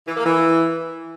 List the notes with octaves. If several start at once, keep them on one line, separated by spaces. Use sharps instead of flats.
E3
A#3
E3